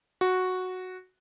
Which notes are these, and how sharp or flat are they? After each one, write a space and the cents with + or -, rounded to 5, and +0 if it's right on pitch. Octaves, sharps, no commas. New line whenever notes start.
F#4 -5